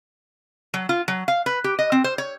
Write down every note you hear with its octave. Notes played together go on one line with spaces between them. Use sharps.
F#3
F4
F#3
F5
B4
G4
D#5
C4
C5
C#5